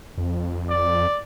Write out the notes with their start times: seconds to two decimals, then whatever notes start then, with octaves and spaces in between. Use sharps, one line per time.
0.18 F2
0.70 D5